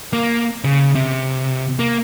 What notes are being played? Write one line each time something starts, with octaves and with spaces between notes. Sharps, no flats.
A#3
C#3
C3
A#3